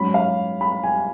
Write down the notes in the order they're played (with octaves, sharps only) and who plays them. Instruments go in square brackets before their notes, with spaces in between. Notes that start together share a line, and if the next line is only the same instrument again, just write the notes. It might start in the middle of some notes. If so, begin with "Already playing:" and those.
Already playing: [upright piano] G#2 F#3 C#4 B5
F5
B5
G#5